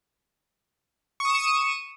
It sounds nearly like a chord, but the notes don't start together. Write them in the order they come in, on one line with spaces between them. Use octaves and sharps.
C#6 D#6 E7 C#7 D#7